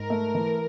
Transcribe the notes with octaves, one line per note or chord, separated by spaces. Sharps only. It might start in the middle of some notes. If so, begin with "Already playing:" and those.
Already playing: G#2 A#4
A3
E3